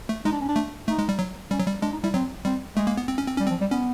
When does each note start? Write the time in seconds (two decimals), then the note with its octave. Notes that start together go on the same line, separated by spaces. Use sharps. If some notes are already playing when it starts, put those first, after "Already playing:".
0.09 A3
0.25 G#3 D#4
0.33 D4
0.41 C#4
0.48 D4
0.56 A3
0.88 A3 D#4
0.98 G#3
1.09 G3
1.19 F#3
1.51 G3 C#4
1.59 F#3
1.67 G3
1.82 G#3 D4
1.92 D#4
2.03 G3 E4
2.14 F#3 C4
2.45 G3 C4
2.76 G#3 A3
2.87 A#3
2.97 B3
3.08 C4
3.18 C#4
3.27 C4
3.38 G3 C#4
3.47 F3 C4
3.61 G3
3.71 B3 C#4